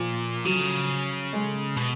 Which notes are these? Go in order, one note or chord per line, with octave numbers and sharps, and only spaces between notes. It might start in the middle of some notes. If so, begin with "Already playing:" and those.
Already playing: A#2 F3
C#3 F#3
G#3
B2